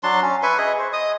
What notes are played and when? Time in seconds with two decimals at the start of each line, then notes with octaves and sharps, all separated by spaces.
0.03 F#3 D4 A5 C6
0.22 C#4
0.43 B4 E5 G#5 C#6
0.58 G#4 D#5 E5
0.79 C5
0.93 D#5 D#6